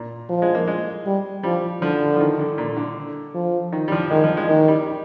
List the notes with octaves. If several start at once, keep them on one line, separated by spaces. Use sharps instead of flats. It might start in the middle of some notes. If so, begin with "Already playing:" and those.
Already playing: A#2
F3
G#3
A#3
G#3
G3
F3 G3
D3 F3
F3
D#3
D3
A#2
D3
F3
D#3
G3
F3
D#3 G#3
F3
G#3
D#3 A#3
G3